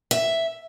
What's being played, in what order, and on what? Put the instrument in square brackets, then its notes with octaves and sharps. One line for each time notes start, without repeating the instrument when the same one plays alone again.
[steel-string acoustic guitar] E5